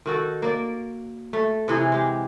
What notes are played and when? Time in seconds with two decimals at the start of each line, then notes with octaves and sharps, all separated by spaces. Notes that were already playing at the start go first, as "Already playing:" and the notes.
0.06 D#3 F#4 A4
0.42 A#3 D5
1.33 A3
1.68 C3 E3 D#4 G#4
1.92 G#3 G4